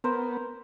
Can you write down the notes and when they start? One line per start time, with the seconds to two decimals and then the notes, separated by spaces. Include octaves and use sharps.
0.04 B3 A#4 C5